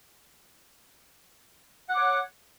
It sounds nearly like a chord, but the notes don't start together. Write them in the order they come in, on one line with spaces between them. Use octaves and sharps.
F#5 D6 C#5